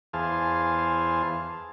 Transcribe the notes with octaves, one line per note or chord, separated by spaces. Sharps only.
E2 G#4 C5 F5 A5